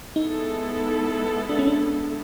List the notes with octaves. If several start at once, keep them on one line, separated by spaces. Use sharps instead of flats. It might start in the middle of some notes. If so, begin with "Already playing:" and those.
G#3 B3 D#4 E4 A4
D4
C#4
D4